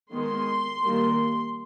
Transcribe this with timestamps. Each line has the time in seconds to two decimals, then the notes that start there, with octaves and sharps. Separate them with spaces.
0.12 D#3 G#3 B3 C6
0.83 D#3 G3 A#3